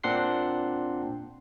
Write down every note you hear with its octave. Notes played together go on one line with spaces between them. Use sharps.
A#2 C4 D4 F#5 C6 C7